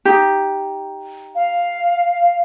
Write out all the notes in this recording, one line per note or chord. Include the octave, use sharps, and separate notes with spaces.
D#4 G4
F5